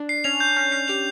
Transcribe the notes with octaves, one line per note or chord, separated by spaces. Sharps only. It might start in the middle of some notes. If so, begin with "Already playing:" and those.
Already playing: D4
C7
C#4 F7
G6
C#4 G6
C#4 C7
G4 F7